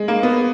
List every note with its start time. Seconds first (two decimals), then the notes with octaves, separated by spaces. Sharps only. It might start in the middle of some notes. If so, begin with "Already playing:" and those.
Already playing: G#3
0.08 A#3
0.23 B3